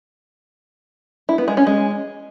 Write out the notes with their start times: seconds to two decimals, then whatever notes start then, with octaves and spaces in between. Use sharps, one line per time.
1.29 E4
1.38 B3
1.48 G#3
1.57 C#4
1.67 G#3